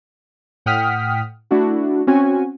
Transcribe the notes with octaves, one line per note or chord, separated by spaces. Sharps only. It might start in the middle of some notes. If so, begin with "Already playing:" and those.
A2 F#5 G5 D#6 F6 B6
A3 D4 E4 F#4
C4 C#4 F#4 G#5